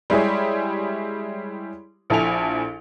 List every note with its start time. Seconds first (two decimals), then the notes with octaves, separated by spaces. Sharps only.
0.10 G3 G#3 E4 G4 G#4 C#5
2.10 A#1 E4 A4 G#5 F7